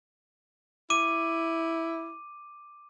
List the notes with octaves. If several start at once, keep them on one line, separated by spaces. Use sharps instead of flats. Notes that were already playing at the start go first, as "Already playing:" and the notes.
E4 D6 D#7